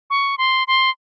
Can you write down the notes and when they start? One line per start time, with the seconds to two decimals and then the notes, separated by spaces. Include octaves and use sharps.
0.10 C#6
0.38 C6
0.67 C6